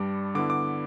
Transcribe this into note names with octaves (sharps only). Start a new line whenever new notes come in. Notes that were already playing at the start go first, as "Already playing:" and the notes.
Already playing: G2 G3 D4 D6
D3 B3 E4 D6
D6